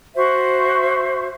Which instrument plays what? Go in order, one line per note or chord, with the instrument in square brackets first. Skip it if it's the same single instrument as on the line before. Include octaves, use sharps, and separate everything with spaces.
[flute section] F#4 C5 E5